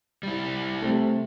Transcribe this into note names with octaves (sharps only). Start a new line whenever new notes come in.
G3 E4
C3 A3